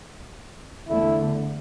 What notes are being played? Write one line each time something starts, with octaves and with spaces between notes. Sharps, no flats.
E2 D3 A3 E4